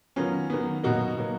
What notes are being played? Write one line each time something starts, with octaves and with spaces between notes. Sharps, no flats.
D#3 F#3 B3 C#4 F4
D#3 F#3 B3
B2 F#3 A#3 D#4 F#4
B2 F#3 A#3